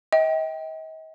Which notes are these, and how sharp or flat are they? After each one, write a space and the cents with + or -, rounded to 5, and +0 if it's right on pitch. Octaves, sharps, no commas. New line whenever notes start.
D#5 +40 G5 +0